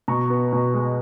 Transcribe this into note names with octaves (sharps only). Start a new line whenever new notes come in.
B2 A#5 C#6
B3
B2
G#3